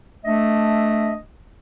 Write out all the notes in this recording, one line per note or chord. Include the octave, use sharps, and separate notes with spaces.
A3 D4 D#5 E5